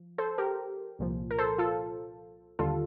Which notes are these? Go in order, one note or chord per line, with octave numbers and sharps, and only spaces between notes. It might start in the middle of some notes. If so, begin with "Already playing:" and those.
Already playing: F3
A4 C5
G4 A#4
C2 A#2 F3
A#4
A4 C5
F4 A4
D#2 D3 G3 F4 A4